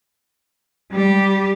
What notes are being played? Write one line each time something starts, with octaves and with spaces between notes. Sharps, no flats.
G3 G4